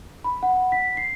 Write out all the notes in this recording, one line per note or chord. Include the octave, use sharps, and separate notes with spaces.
B5
F#5
B6
C7